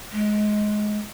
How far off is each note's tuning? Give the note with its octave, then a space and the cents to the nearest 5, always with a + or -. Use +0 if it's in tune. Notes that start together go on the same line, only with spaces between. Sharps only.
G#3 +20